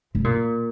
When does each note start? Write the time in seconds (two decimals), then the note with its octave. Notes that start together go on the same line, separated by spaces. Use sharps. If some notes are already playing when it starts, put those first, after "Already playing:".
0.15 C3
0.24 A#2